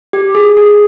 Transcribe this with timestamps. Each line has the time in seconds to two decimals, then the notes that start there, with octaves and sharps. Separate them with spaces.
0.13 G4
0.35 G#4
0.57 G#4